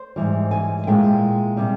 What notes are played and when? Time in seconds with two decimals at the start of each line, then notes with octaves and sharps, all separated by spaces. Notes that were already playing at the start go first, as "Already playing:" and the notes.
Already playing: C5
0.16 G#2 E3 G3
0.51 G#5
0.87 A#2 G#3 E4 G5
1.57 C3 G3